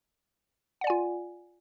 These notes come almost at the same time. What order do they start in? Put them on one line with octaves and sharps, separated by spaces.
F#5 D5 G#5 F4